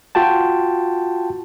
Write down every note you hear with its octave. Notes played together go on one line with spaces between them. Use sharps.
F4 F#4 G5 A5